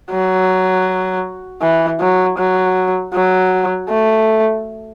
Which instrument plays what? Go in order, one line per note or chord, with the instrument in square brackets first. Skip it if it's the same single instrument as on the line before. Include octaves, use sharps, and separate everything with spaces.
[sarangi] F#3
E3
F#3
F#3
F#3
A3